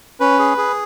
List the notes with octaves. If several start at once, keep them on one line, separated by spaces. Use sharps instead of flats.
C#4 B4
G#4
G#4